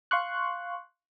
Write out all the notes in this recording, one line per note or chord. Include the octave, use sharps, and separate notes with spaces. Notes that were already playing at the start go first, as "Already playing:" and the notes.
F5 C6 C#6 F#6